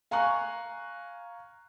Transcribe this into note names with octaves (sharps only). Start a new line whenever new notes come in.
F5 G#5 A#5 C#6 F#6